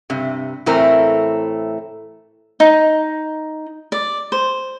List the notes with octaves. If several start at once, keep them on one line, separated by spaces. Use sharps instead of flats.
G2 C3
A2 E3 A3 C4 A#4
D#4
D5
C5